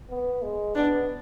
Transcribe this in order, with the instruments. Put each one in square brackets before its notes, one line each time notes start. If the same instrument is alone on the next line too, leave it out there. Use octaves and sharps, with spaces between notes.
[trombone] B3
G#3
[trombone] B3 [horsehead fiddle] D4